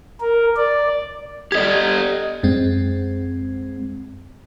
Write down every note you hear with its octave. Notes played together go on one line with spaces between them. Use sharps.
A#4
D5
G4 A4 D5 D#5 G#6
F#2 G#3 C4